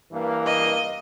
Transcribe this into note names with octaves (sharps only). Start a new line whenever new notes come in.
G2 E3 A#3
D#5